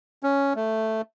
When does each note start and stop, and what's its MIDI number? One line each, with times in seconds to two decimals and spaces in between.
0.23 0.53 61
0.56 1.02 57